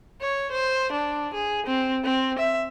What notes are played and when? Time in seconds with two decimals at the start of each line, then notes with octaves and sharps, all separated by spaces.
0.21 C#5
0.51 C5
0.92 D4
1.34 G#4
1.66 C4
2.04 C4
2.39 E5